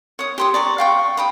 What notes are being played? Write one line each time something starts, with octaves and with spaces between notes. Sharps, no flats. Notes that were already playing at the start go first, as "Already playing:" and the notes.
C#5 D#6
G4 C6 D#6
D5 A#5 C#6
F5 G5 C#6
G5 B5 D#6